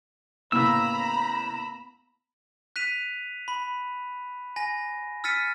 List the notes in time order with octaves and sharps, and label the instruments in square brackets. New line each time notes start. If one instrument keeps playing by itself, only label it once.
[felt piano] A2 C#3 [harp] A#3 B3 [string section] A#5 B5 [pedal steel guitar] E6
[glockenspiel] F#6 B6 D#7 F7
B5
G#5 A#6
E6 F6 A6 B6 C#7 D#7